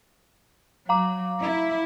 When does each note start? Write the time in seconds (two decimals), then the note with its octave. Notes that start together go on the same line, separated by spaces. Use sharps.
0.89 F#3 F5 A#5 D6
1.41 E4